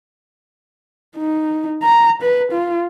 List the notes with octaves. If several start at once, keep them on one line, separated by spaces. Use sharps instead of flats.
D#4
A#5
B4
F4